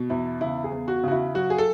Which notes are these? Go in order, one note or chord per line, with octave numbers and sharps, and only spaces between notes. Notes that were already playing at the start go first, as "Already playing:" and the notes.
Already playing: B2
E2 E4
C#3 E4
G#4
E2
F#4
C#3 F#4
E4
F#3 F#4
G#4
A4